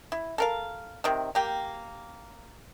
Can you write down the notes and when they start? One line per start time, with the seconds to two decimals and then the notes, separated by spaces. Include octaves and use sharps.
0.12 E4
0.38 A4 A#4 F5
1.04 C3 D#3
1.35 A#3 G4 G5